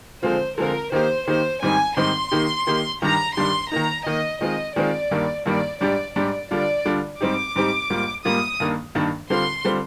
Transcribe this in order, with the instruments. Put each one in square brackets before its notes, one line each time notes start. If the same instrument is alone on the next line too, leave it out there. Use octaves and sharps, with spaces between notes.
[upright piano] D3 F3 G#3 C4 F4 [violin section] C5
[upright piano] D3 F3 G#3 C4 F4 [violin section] A#4
[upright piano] D#3 A#3 D#4 G4 [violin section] C5
[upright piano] D#3 A#3 D#4 G4 [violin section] C5
[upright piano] G#2 D#3 G3 C4 D#4 [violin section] G#5
[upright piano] G#2 D#3 G3 C4 D#4 [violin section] C6
[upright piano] D#3 A#3 D#4 G4
D#3 A#3 D#4 G4
[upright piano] G2 D#3 G3 D4 G4 [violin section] A#5
[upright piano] G2 D#3 G3 D4 G4 [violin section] C6
[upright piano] D#3 A#3 D#4 [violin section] A#5
[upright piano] D#3 A#3 D#4 [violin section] D#5
[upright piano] D#3 G#3 C4 F4 [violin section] D#5
[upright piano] D#3 G#3 C4 F4 [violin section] D5
[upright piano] G2 D#3 G3 A#3
[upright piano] G2 D#3 G3 A#3 [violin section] D5
[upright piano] G#2 G3 D4 G4 [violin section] D5
[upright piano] G#2 G3 D4 G4 [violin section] D5
[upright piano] D3 G3 D4 F4 [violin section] D5
[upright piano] D3 G3 D4 F4
[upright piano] G#2 G3 C4 D#4 G4 [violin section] D6
[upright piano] G#2 G3 C4 D#4 G4
G#2 G3 A#3 F4
[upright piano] G#2 G3 A#3 F4 [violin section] D#6
[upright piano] G2 D#3 A#3 D4
G2 D#3 A#3 D4
[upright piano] D3 G3 C4 F4 [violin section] C6
[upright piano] D3 G3 C4 F4